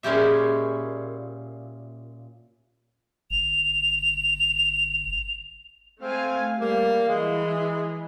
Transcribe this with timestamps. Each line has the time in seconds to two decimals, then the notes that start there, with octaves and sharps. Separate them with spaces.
0.03 A#2 G#3 C#4 E4 G4 E5
3.31 G1 F7
6.01 A3 C4 F5 G#5
6.60 G3 A#3
7.08 E3 G#3